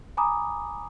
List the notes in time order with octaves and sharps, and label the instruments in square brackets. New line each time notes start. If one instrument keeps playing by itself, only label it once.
[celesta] G#5 A#5 B5 D6 D#6